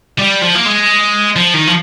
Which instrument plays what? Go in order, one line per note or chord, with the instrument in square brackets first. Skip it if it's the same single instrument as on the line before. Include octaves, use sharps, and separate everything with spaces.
[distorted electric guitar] G3
F3
A#3
G#3
F3
D#3
F3